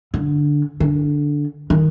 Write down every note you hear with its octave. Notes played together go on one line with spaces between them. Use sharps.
D3
D3
D#3